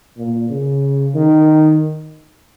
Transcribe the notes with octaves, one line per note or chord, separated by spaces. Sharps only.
A#2
C#3
D#3